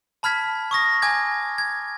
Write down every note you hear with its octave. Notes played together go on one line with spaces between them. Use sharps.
A5 B5 F6 G#6 B6
C#6 D#6 A#6
G#5 D6 G6 G#6
G#6